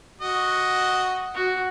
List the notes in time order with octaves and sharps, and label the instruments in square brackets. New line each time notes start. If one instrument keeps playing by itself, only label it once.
[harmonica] F#4 D#5
[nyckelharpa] F#4